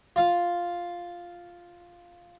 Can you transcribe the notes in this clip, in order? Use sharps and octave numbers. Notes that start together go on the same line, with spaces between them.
F4 F5